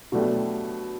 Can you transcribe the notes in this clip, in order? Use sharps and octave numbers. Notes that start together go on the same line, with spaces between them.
B2 F#3 A3 D4 G4